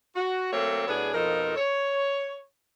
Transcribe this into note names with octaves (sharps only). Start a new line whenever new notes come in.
F#4
F#3 A3 A#3 C4 A4 C#5
A2 F#3 B3 D4 G#4
F2 B2 F3 D#4 A4 A#4
C#5